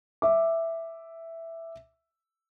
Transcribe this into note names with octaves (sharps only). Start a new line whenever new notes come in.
E5 D6